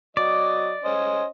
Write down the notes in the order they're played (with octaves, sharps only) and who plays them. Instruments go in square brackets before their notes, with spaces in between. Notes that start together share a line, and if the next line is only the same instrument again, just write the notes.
[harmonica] F#3 D#5 [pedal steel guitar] D5
[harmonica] C#4 C5 D#5